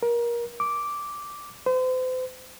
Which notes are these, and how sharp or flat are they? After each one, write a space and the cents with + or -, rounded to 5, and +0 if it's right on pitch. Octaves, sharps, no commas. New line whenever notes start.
A#4 +25
D6 -5
C5 -40